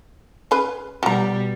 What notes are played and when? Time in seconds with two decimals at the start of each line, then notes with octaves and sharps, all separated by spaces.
0.51 C#4 G#4 B4
1.03 B2 F#3 G3 A#5